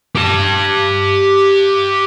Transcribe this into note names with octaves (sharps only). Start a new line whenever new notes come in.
G4 A5